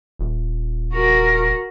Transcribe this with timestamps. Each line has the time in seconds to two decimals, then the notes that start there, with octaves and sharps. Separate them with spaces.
0.19 D#1
0.93 F#4 A#4